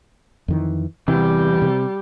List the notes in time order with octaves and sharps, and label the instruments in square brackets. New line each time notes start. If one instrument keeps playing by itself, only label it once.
[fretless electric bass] F2 D#3 E3
[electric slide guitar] E2 [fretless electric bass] C3 [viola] G3 G4
[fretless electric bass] C3